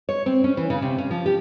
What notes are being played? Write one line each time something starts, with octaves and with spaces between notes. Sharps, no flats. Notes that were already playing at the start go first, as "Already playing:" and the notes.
C#5
C4
C#4
E3
C#3
C3
C#4
F3
G4